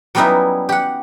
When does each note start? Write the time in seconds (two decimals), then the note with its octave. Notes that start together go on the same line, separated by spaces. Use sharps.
0.15 F#3 G3 B3 C#4 D#4 E4
0.69 G4 F#5